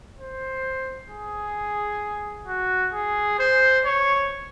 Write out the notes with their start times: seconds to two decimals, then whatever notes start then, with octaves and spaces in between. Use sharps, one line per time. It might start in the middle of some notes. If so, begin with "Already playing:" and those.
0.18 C5
1.10 G#4
2.47 F#4
2.93 G#4
3.39 C5
3.85 C#5